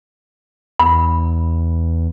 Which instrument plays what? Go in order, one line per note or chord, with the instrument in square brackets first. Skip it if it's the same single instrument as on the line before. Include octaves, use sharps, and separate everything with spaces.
[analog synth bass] E2 [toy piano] B5